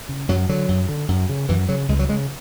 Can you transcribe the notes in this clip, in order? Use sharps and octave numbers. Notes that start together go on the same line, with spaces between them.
C#3
F#2 F#3
D3 F#3
F#2
D3
F#2
C#3
F#2 E3
C#3 F#3
C#2 G#3
F#3
C#3 G#3